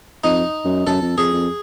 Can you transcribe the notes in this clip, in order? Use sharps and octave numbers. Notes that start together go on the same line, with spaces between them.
F2 D#4
F#2
F#2 A4
F2
F2 G#4
F2